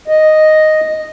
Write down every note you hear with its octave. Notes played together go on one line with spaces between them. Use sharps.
D#5